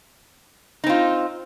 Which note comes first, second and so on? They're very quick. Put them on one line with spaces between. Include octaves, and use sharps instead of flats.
D#4 C4 F4